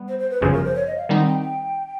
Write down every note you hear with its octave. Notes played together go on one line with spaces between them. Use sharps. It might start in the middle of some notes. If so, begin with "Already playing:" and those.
Already playing: G3 B3
C5
C5
B4
G1 F#2 C#3 F3 G#4
A#4
C5
C#5
D#5
F5
D#3 G3 C4 D#4 F#5
G5
G5